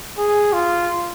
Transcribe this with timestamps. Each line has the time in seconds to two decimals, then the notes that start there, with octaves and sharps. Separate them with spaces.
0.18 G#4
0.53 F4